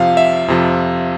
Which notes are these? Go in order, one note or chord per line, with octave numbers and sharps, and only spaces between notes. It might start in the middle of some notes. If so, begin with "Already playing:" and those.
Already playing: F2 C3 F3 F5
E5
F2 C3 F3